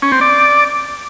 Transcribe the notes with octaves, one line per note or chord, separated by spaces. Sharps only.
C#4
C4
D5